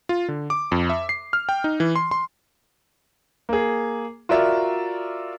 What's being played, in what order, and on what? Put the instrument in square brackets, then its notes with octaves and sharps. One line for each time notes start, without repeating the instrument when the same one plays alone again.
[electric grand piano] F4
D3
D6
F2
E5
C7
F6
G5
D#4
E3
C6
C6
[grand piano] A#3 G#4
F4 F#4 A#4 D5 E5